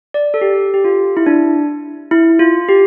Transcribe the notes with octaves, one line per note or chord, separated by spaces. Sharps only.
D5
A4
G4
G4
F4
E4
D4
E4
F4
G4